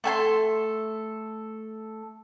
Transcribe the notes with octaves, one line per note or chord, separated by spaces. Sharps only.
A3 A4 G#5 C6